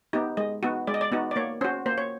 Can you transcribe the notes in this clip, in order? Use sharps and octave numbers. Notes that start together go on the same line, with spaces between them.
B3 D#4 G4
G#3 D#5
B3 D#4 F#4
G#3 D5
D#5
D5
B3 D#4 F#4
D5
A#3 C#5
C#4 F#4 C5
A#3 C5
C#5